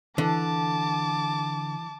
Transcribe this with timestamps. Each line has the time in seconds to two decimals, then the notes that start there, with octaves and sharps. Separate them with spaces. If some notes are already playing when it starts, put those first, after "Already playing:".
0.18 D3 E3 A5 D6